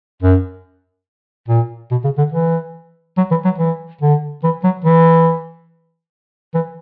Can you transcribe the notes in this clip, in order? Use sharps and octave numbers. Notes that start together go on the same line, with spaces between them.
F#2
A#2
B2
C#3
D3
E3
F#3
E3
F#3
E3
D3
E3
F#3
E3
E3